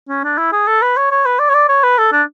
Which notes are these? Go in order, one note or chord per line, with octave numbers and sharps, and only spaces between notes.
C#4
D4
E4
G#4
A4
B4
C#5
C#5
B4
D5
C#5
D5
C#5
B4
A4
D4